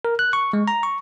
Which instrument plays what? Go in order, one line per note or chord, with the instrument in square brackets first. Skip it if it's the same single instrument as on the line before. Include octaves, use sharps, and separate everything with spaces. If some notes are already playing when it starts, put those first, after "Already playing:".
[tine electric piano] A#4
F#6
C#6
G#3
A#5
C#6